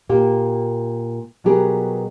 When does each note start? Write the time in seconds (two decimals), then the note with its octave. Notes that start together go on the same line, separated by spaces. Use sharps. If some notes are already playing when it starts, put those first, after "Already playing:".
0.09 A#2 A#3 G4
1.44 B2 F#3 B3 G4 G#4 A#4